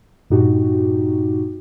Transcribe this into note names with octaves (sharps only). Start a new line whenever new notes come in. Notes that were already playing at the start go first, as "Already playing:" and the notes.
G2 A#2 D#4 F#4 G4